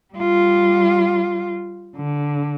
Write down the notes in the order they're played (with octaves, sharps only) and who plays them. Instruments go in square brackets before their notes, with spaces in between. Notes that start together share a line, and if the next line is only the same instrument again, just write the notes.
[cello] G3 F4
D3